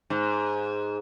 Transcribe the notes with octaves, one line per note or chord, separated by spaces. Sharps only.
G#2